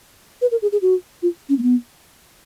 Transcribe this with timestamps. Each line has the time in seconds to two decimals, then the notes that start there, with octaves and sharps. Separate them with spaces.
0.42 B4
0.52 A#4
0.62 G#4
0.72 G#4
0.82 F#4
1.23 F4
1.49 C#4
1.58 A#3
1.63 B3